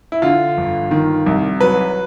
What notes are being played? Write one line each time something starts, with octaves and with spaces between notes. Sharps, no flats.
E4
D3 F4
G1
D#3
C2
F#3 B4